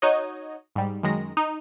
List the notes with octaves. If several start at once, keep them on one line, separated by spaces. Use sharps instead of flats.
D#4 F#4 C#5 D#5
G#2 G3
F#2 D#3 G#3 A#6
D#4